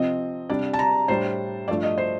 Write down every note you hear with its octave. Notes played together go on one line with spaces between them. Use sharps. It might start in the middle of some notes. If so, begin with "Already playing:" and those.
Already playing: C3 F3 C4 D#5
C3 G3 D4 D5
A5
A#5
A2 G3 D4 C5
G2 F3 A3 D4 D5
D#5
C5